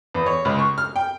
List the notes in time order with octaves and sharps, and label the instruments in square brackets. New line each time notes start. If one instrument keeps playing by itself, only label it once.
[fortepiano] E2
C#5
C#2
C#6
F6
G5